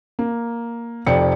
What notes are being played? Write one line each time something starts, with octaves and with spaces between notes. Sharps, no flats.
A#3
F1 F2 D5 G5 C#7